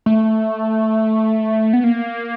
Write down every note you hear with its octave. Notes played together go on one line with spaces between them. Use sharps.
A3
B3
A#3